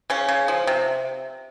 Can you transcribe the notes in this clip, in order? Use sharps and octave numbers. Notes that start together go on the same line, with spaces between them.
C#3 C#4
C#3
F3
C3